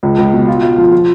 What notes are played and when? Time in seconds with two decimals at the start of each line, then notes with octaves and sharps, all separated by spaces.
0.03 C#2
0.18 C#2
0.33 B2
0.48 F4
0.63 F4
0.78 F3
0.92 F3